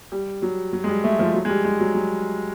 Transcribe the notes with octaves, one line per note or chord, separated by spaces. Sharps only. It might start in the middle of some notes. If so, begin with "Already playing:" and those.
G3
F#3
F#3
G#3
G3
A3
F3
F#3
G#3
G3
G#3
F#3
F#3